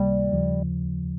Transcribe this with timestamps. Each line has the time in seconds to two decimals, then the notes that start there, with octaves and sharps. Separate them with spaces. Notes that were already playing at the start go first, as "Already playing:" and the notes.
Already playing: C#2 C3 D#3 G3 A#3
0.31 D#2 C#3 F3